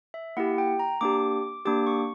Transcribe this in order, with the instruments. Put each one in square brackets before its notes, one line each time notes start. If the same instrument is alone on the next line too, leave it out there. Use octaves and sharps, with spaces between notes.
[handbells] E5
A#3 E4 G4 F#5
G5
A#5
A#3 D4 G4 D6
A#3 D4 G4 D6
C#6